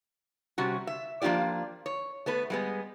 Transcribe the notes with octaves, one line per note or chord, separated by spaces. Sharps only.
C3 G3 C#4 F#4
E5
F3 A#3 D4 F4 G4 D5
C#5
A3 B3 B4
G3 G#3 B3